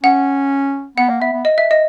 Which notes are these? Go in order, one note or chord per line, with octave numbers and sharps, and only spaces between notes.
C#4 F#5
B3 F#5
A#3
B3 E5
B3
D#5
E5
D#5